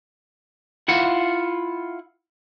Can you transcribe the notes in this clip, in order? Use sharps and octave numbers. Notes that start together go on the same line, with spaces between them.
E4 F4 F#5